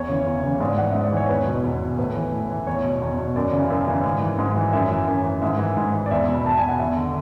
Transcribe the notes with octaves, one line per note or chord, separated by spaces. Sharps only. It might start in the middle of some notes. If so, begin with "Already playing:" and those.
Already playing: E2 C#5
C#3 E3
E2
C#3 E3
G#2 D5
E3 F#5
G#2 E5
D5
E3 C#5
E2 B4
B2
E2
B2
A2 B4
E3
A2
E3
E2 C#5
B2
E2
B2
F#2 D5
C#3 E3
F#2
C#3 E3
G#2
E3
G#2
E3
F#2 E5
E3
F#2
E3
G#2 E5
E3
G#2
E3
D5
E2 E5
B2
B5
E2 A5
B2 G#5
F#5
E2 E5
D3